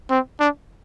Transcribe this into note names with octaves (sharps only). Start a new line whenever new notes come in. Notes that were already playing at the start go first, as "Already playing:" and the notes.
C4
D4